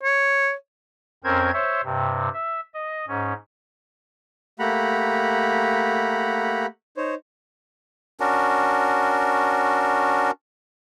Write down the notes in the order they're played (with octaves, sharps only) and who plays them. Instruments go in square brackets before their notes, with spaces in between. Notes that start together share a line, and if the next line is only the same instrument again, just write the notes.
[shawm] C#5
[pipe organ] F2 C4 C#4 A#4 C5 G#6
C5 C#5 E5
G2 C3
E5
D#5
G#2 C#4
[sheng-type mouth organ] A3 A#3 G4 F#5 A#5 B5
D#4 C5 C#5
[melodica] C#4 D4 F#4 A#4